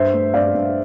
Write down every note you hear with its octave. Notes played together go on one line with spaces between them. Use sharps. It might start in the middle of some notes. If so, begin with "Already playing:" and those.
Already playing: G2 C5 E5
A3
G2 D5 F5
G2